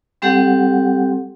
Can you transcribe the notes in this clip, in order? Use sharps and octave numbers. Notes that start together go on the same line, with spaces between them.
G3 C4 G4 A4 F#5